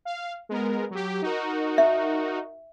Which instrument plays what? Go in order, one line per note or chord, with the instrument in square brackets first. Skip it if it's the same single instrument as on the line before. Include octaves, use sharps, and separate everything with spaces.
[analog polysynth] F5
G#3 B3 A#4
F#3 G4
D#4 F#4 A#4
[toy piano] E5